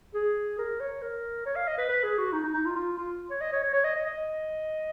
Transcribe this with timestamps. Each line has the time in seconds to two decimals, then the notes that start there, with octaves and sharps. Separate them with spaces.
0.14 G#4
0.58 A#4
0.80 C#5
1.02 A#4
1.45 C#5
1.56 F5
1.68 D#5
1.78 B4
1.89 B4
2.03 G#4
2.18 F#4
2.32 D#4
2.43 D#4
2.54 D#4
2.65 F4
2.75 F4
2.97 F4
3.30 C#5
3.41 D#5
3.52 C#5
3.63 C#5
3.73 C#5
3.84 D#5
3.96 D#5
4.06 D#5